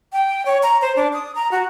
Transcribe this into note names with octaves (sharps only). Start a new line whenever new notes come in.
G5
C#5
A#5
C5
D4
D#6
A#5
F#4